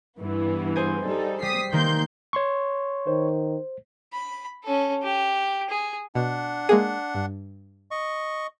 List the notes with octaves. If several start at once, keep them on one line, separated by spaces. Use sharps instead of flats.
G2 E3 B3
G#4 C5 G#5
G3 D#4 A4
G3 D#6 B6 C7
D#3 A#3 C6 G6
C#5 C6 C#6
D#3 C5
B5
C#4 A4
G4
G#4
B2 D4 F#5
G#3 A#3 G#4
G2
D#5 C#6